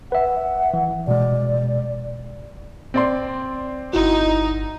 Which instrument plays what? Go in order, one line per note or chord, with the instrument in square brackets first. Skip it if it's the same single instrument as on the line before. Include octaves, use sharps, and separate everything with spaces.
[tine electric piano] B4 E5 [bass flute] F#5
[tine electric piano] E3
[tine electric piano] B2 G#3 [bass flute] D5
[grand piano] C4 D5 C6
[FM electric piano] G1 E4 F#4 [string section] D#4